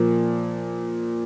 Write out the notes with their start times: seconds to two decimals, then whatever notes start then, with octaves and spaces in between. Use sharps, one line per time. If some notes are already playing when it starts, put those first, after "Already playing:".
Already playing: A#2 F3 A#3